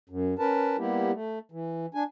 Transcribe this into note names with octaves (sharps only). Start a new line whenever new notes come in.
F#2
C#4 A#4 B4 A5
G3 A#3 B3 E4 G4
A3
E3
D4 G#5